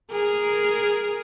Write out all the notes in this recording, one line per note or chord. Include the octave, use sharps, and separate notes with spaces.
G#4 A#4